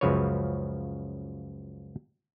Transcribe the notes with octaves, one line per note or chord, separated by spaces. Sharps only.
C#2 F#2 C#3 F3 B4 C#5